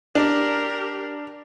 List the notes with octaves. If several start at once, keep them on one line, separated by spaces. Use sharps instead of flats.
D4 G4 A#4